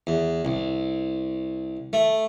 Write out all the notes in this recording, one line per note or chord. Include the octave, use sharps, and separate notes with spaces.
E2
C2
A3